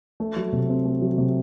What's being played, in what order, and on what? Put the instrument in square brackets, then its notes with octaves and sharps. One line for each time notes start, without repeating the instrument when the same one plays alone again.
[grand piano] A3
F#3
C3
C4
A3
F#3
C3